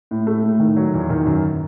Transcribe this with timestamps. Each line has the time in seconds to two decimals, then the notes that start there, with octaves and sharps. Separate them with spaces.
0.11 A2
0.27 A3
0.43 A2
0.60 D#3
0.77 F#3
0.94 E2
1.10 D#3
1.26 F#2